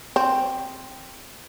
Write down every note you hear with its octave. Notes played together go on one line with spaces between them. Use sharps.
C4